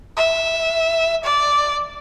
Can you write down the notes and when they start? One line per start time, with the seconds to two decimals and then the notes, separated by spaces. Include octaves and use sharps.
0.17 E5
1.24 D5